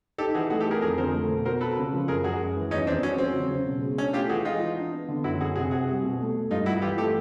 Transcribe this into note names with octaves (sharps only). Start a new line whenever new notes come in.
D#4 G4 A4
E3 F#4 G#4
A3 F#4 G#4
G4 A4
A3 G#4 A#4
F2 G#4 A#4
D3 A#4 C5
A3
B2
F#4 A#4 C5
F#4 A4 B4
C#3
F3
F#2 G#4 A#4
F#2 F#4 G#4
G#3
E3
E2 C#4 D#4
E2 C4 D4
F#3 C#4
F#3 C4
C#3
C#3
B2
G#3
C#4 D4
A3 F4 G4
E3 F#4 G#4
G#3 D#4 F4
E3
D4
B3
D3
F#2 E4 F#4
F#2 F#4 G#4
C3 F#4 G#4
C4 F#4 G#4
G3
B2
A3
A3
G2 D#4 F4
G2 E4 F#4
E3 F4 G4
A3 G4 A4